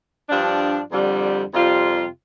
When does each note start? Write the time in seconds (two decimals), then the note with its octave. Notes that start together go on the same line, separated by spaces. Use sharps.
0.29 G2 F3 D4
0.92 F2 D3 G3
1.54 F2 C3 G3 F4